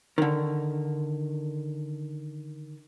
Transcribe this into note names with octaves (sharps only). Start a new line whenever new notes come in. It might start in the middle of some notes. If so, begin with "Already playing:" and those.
D3 D#3